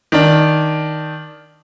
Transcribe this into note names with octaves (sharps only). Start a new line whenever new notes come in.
D#3 D4